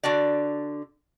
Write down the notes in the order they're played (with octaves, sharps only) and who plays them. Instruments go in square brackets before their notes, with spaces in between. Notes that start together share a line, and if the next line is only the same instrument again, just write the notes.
[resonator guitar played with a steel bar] D3 D4 F#4 D5